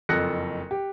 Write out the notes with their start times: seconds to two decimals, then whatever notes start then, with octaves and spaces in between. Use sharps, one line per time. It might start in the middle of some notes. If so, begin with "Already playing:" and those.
0.09 F#1 F2 A4 F#6 A#6 C#7
0.71 G4